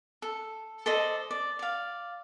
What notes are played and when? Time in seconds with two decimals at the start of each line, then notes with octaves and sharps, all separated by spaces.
0.22 A4
0.86 A4 C5 D5 D#5
1.31 D5
1.59 D5 F5